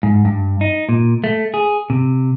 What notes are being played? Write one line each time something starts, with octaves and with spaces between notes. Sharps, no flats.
G#2
G2
D#4
A#2
A3
G#4
C3